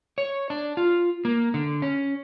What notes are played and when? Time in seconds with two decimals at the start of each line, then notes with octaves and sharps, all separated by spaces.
0.18 C#5
0.50 D4
0.77 F4
1.25 A#3
1.54 D3
1.82 C#4